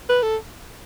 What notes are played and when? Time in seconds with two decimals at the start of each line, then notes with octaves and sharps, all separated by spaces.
0.09 B4
0.23 A4